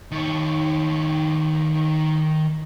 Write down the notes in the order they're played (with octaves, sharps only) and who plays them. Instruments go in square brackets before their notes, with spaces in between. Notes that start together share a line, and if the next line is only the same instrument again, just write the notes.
[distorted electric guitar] D#3 C#5